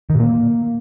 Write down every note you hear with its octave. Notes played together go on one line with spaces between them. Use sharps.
D#3
A#2
A#3